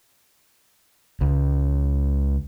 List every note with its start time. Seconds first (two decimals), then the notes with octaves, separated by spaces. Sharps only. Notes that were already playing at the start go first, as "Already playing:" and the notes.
1.21 C#2